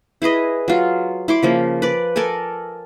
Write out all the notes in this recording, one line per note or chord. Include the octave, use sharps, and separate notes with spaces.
E4 G#4 B4 D#5
F#3 F4
E4 C6 D6
C#3 F3 A#3
B4 D5
A4 A#4 D5 G#5